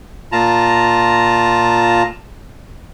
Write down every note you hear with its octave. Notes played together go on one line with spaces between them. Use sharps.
A#2 F4 A5 A#5